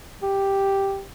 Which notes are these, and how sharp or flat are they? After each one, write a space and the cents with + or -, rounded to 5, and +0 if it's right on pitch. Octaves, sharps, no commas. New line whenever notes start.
G4 +0